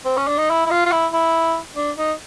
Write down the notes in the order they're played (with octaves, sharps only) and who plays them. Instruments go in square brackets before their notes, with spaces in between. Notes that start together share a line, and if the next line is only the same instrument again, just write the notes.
[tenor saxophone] C4
C#4
D4
D#4
E4
E4
F4
F4
E4
E4
D4
D#4